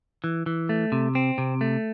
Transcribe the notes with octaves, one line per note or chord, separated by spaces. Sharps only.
E3
E3
A3
C3
C4
C3
A3